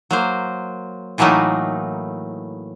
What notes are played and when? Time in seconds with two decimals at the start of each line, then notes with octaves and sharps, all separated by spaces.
0.11 F#3 A#3 C5
1.18 A2 E3 F#3 A3 A#3 D#4